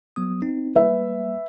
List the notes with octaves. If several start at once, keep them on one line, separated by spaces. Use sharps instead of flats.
F#3 B3 D#6
C4 D#4
G3 A#3 B4 E5